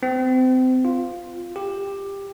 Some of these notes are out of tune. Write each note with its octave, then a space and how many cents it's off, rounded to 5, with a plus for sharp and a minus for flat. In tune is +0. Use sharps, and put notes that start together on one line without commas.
C4 -30
F4 +0
G4 +15